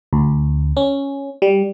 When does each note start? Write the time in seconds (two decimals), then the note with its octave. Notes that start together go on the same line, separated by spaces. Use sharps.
0.13 D2
0.77 C#4
1.42 G3